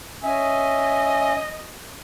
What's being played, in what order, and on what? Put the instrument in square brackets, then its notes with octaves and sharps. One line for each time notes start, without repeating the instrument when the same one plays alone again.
[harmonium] C#4 E5 G#5 [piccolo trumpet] D#5